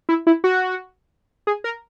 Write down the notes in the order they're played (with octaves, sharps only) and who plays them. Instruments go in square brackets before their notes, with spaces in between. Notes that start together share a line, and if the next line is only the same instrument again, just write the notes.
[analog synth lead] E4
E4
F#4
G#4
A#4